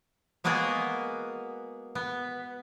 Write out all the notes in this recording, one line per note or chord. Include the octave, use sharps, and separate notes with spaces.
G#3 A#3 B3 F#4 G#4 A#4
B3